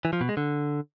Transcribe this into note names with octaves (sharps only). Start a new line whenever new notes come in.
E3
F3
B2
G#3
D3